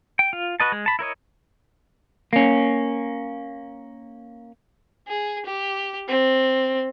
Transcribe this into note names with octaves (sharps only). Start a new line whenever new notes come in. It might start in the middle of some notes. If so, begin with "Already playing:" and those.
G5
F4
F#4 B4 D#5 A5
G#3
A5 B5
E4 A#4 C#5 D#5
A#3 C#4
G#4
G4
C4